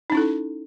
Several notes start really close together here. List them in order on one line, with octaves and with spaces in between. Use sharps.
D#4 C#4 E4 A4